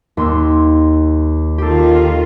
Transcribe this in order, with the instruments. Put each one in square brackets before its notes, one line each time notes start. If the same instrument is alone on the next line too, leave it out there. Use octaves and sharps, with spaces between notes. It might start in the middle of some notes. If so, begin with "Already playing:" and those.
[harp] D#2 C6 E6
[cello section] D#3 F4 [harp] G4 A4